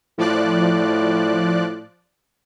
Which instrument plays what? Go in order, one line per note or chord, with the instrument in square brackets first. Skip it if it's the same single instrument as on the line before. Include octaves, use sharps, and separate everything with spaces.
[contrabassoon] A2 [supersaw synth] F3 D5 F#6